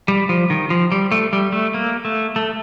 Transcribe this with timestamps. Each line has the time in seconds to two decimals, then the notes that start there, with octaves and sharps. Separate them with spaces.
0.08 G3
0.29 F3
0.50 D#3
0.70 F3
0.92 G3
1.12 A3
1.33 G3
1.52 A3
1.74 A#3
2.05 A3
2.36 A3